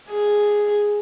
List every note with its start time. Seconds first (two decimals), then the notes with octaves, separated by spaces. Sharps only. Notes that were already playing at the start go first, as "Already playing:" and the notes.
0.10 G#4